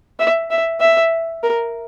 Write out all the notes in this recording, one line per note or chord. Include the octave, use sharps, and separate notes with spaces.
E5
E5
E5
A#4